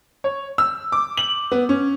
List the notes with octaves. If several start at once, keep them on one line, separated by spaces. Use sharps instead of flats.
C#5
E6
D6
F#7
B3
C#4